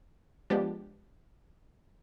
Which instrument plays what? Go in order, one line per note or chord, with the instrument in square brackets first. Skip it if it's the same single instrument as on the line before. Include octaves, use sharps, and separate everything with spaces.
[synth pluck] F3 G#3 B3 D4 G4